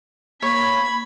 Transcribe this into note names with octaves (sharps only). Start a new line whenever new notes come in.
A#3 C#5 B5 G#6 B6